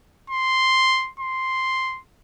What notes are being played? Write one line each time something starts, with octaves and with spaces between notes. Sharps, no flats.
C6
C6